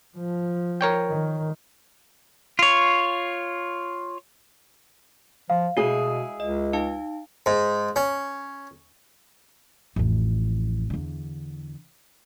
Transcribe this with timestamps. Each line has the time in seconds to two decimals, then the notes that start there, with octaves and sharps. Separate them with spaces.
0.17 F3
0.81 A#4 C#5 G5
1.09 D#3
2.59 F4 C#5
5.50 F3 F5
5.77 B2 G#3 E4 F#4 G#4
6.40 C#2 D#5
6.73 D#4 F5 A5
7.46 G#2
7.96 C#4
9.96 A1 F2
10.90 E2 D3